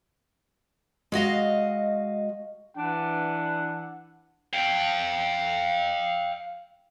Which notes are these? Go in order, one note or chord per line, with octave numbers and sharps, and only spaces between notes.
G#3 F#4 D#5 F5
E3 D4 F#5
F5 G5